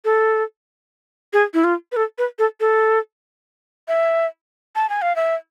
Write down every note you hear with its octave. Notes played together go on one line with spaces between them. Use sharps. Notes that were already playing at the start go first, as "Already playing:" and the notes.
A4
G#4
E4
F4
B4
A4
B4
A4
A4
E5
A5
G#5
F5
E5